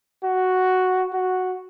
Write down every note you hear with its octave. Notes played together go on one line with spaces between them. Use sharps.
F#4
F#4